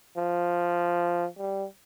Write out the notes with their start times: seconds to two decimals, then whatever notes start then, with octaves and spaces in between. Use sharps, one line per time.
0.17 F3
1.38 G3